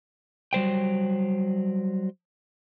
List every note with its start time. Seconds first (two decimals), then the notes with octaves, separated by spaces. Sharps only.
0.53 F#3 G3 C5 G5